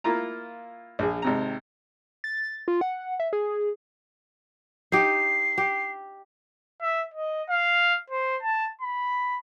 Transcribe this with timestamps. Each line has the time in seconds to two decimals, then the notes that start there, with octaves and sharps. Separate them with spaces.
0.04 A#3 E4 F4 A#5
0.99 A#1 G#4
1.22 G#1 C3 A#5
2.24 A6
2.68 F4
2.81 F#5
3.20 E5
3.33 G#4
4.92 D#4 G4 C7
5.58 G4
6.82 E5
7.14 D#5
7.50 F5
8.10 C5
8.43 A5
8.81 B5